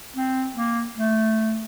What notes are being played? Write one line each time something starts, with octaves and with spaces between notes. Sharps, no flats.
C4
A#3
A3